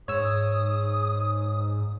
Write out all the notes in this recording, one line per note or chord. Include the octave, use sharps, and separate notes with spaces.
G#2 C#5 D#6 E6